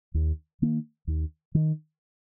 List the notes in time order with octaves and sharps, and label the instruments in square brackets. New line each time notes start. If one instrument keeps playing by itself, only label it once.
[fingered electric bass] D#2
D#3 A#3
D#2
D#3